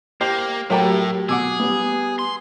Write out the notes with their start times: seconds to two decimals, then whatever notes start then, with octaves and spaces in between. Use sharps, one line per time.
0.21 A#3 G4 C5 C7
0.70 A2 F#3 A3 G4 A#4 G5 A#5
1.29 B2 G#4 F#5 D6 E6
1.60 G3 B3
2.19 C6